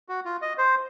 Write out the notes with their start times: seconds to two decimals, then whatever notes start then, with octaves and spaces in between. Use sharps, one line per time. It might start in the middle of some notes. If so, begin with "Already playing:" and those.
0.09 F#4
0.25 F4
0.42 D#5
0.58 C5